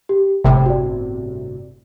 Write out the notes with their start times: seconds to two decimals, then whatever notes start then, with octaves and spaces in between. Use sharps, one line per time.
0.09 G4
0.44 G1 A2 C3 G5
0.66 F#4 D5